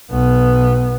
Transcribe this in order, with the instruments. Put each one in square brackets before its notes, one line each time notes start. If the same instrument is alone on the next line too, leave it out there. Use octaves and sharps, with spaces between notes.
[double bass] B1 B3